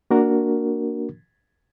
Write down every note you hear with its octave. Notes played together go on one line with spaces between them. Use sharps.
A#3 D4 F#4 A#4